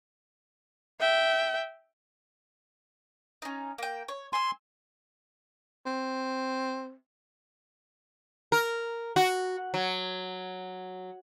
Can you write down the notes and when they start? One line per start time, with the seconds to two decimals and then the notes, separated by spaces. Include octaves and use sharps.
1.00 E5 G5
3.42 C#4 D#4
3.78 A#3 G5
4.08 C#5
4.33 G#5 C6 E6
5.86 C4
8.52 A#4
9.16 F#4
9.74 F#3